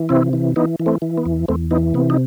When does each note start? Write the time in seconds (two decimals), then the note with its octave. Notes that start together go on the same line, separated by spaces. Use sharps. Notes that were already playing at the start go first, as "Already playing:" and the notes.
Already playing: E3
0.09 C3 C4 E4
0.33 E3
0.56 E3 B3 D#4
0.80 E3
0.86 A3 C4
1.02 E3
1.17 B3
1.26 E2
1.48 E2 A3 C4
1.71 E3 B3 D#4
1.94 C3 B3
2.10 D#4